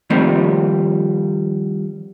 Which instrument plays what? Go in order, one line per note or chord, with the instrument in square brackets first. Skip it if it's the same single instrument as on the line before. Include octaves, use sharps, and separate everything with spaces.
[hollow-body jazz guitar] D#3 F3 G3 A3 A#3 C4